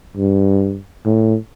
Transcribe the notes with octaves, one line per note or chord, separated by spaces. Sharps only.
G2
A2